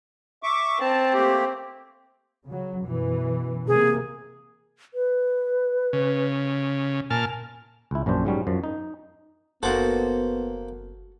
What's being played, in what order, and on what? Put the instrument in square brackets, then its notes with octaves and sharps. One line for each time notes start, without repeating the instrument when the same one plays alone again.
[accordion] E5 C#6 D6
[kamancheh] C4 [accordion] A5
[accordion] A3 A#3 G4
[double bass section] C#3 F#3
F#2 B2 E3
[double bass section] C3 A#3 [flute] G#4
[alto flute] B4
[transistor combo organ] C#3
[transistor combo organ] A#2 A5 F6 [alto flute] G#5
[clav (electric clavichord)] C#2 E4
A#1 F#2 C#4 D4 C5
G#2 F#3 G3 C#4
F#2 F3
D#4
[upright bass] F#1 [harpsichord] A#3 C5 F#5 [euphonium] B3 [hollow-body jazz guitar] F#4 A4